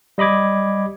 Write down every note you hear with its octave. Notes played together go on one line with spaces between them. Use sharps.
G3 D#5 B5 D6 G#6